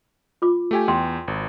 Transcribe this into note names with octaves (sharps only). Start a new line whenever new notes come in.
F4 D6
A3 G4 G#5
E2 G5 C6
G#1